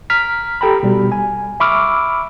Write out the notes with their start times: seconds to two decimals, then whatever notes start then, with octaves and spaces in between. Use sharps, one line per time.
0.10 A#5 F6 B6
0.61 G4 A4 G5 A#5 B5
0.83 B2 G3
1.12 G#5
1.60 E5 B5 C#6 D6 E6 F6